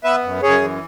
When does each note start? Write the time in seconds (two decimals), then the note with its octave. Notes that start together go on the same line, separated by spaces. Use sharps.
0.04 B3 B4 E5
0.24 F#2
0.43 F#2 G#4 C#5
0.62 E3